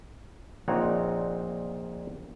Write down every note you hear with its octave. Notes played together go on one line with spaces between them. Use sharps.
A#1 A#2 C4 D#4 C#5 F#5